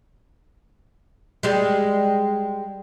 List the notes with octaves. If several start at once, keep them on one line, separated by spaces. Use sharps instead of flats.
G3 G#3